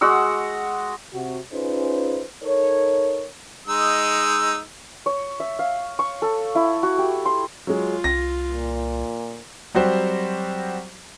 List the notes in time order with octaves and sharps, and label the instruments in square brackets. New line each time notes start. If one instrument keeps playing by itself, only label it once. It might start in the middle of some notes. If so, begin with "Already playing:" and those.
[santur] G#3 F#4 F#5 E6
[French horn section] C3 F#4
C#4 D#4 F4 G#4 B4 C5
D#4 A4 A#4 C#5
[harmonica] G#3 D#4 E6
[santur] C#5
E5
F5
C#6
A4
E4
F#4
G4
C6
[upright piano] F#3 G#3 [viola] F4
[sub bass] C2 [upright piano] A#6
[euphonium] A#2
[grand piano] F#3 G3 C4 F#4 G4 C5